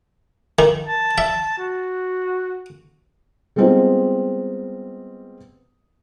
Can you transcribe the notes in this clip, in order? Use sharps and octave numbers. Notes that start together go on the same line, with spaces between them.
D#3
A5
E5
F#4
G3 G#3 B3 C4 D#4 F4